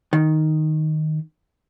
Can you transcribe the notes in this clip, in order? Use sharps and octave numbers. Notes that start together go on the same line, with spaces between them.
D#3